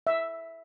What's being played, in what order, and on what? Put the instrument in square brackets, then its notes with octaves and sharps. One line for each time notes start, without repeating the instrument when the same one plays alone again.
[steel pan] E5